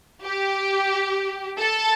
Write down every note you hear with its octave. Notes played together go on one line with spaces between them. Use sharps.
G4
A4